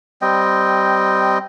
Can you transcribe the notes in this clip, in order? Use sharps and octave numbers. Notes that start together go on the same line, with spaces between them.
G3 C4 D#5 G5